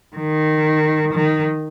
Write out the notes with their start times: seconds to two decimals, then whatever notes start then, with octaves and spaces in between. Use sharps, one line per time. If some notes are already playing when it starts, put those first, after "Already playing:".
0.16 D#3
1.14 D#3